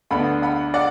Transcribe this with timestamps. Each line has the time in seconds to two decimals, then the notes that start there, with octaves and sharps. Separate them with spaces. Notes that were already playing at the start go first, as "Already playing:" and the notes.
0.11 D2 D3 B3 D4 F#5 B5
0.42 F#5 B5
0.74 D5 F#5